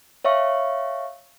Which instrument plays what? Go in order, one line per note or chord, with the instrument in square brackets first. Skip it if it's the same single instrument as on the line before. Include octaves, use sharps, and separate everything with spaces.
[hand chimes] C#5 E5 F5 C#6